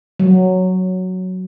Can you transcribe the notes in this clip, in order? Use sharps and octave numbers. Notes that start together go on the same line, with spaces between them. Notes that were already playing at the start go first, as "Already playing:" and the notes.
F#3